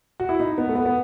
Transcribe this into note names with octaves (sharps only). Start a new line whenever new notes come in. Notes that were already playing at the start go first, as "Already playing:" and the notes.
F#4
E4
D#4
B3
A3
B3
B3